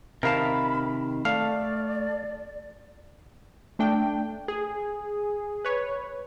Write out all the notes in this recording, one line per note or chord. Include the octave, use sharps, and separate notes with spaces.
C3 D#3 A#4 F5 A5 B5
A3 D5 F5
A3 D4 G5
G#4
B4 C#5